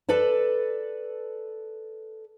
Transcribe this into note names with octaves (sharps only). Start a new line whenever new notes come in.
A4 B4 D5 A5